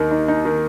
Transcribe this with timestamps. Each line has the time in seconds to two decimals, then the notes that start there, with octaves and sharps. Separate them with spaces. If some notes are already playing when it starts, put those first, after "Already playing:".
Already playing: D#2 D#3 D#4
0.11 D#4
0.28 D#4
0.45 D#3